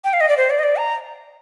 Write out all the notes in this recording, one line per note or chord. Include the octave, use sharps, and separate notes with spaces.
G5
F5
D#5
D5
C5
D5
D#5
D5
A#5